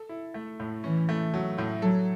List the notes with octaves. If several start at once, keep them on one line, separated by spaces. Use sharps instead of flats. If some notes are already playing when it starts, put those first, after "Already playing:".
Already playing: A4
E4
A3
A2
E3 C#4
A3
F#3
A2
F#3 A4